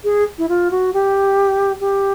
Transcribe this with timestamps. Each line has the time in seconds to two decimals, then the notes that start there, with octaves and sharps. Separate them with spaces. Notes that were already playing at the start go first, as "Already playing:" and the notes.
0.04 G#4
0.38 E4
0.49 F4
0.71 F#4
0.93 G4
1.80 G4